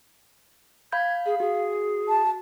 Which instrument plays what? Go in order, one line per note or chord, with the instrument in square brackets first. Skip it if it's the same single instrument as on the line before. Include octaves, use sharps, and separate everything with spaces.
[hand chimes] F5 B5 G6 [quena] G#6
[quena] G#4 [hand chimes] F5
[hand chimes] F#4 [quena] G#4
[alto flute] A5